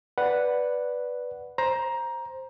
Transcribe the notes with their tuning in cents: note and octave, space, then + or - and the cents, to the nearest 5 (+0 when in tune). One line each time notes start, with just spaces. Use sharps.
B4 +0 D5 +0 F#5 -5
C5 +5 A#5 +15